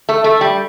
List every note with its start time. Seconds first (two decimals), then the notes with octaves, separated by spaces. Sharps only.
0.09 A3
0.24 A3
0.41 G3